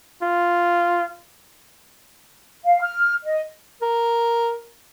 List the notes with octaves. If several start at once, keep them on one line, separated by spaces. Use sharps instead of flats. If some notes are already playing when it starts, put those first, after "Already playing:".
F4
F5
F6
D#5
A#4